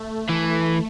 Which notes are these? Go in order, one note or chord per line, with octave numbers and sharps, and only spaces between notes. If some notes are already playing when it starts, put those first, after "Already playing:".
Already playing: A3
E3